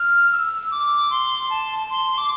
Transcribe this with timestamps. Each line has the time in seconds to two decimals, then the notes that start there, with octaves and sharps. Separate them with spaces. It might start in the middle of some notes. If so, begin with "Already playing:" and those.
Already playing: F6
0.32 E6
0.71 D6
1.10 C6
1.50 A5
1.90 C6
2.18 D6